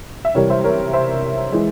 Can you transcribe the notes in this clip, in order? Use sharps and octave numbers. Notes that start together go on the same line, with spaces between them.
E5
C3 E3 G3 A#4 C#5
C5 E5
A#4 C#5
C5 E5
E3 G#3